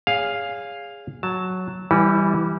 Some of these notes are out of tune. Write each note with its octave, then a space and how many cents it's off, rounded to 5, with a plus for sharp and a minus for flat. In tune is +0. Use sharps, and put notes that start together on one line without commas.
G#4 -15 C#5 +30 F5 +0
F#3 +0 A5 +5
E3 +0 G3 +0 E4 -40